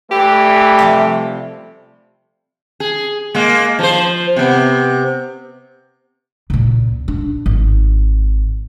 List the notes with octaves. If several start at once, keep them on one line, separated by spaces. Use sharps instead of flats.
G2 E3 A3 G4
C3 F3 G3
G#4
G#3 A#3
F3 C5
C3 B3
C#2 A#2
D4
G#1